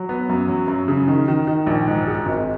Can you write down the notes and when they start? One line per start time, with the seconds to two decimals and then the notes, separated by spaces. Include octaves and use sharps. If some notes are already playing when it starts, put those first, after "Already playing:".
Already playing: F#3
0.09 B3
0.29 F#2
0.48 F#3
0.68 F#2
0.88 C#3
1.08 D#3
1.28 D#3
1.47 D#3
1.67 A#1
1.88 G#2
2.07 G#3
2.26 G#1